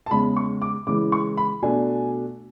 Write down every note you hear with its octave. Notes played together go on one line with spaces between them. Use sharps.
A5
E2 C#3 G#3 B5
C#6
D6
C#3 E3 G#3 D6
C#6
B5
B2 A3 D4 G#5